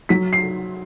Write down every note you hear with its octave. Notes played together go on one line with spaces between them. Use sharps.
F#3 B6
C7